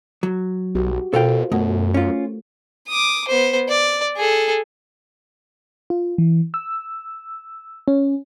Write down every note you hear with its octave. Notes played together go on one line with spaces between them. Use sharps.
F#3
B1 F#4 G4
B2 F4 A4 A#4 C5 F5 G5
F#2 B2 A3
C#4 F4
D6 D#6
B3 C5
D5
G#4 A4
F4
E3
E6
C#4